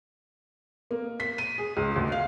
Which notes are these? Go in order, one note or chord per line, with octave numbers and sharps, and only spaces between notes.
A#3
B6
D#7
G#4
C#2
D2
F5